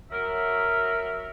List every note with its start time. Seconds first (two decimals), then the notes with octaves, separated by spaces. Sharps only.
0.11 F#3 A#4 E5